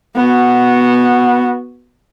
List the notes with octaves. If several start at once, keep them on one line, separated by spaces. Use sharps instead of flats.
B3 F#4